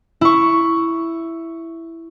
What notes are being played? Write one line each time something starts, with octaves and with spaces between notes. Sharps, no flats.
E4 C#6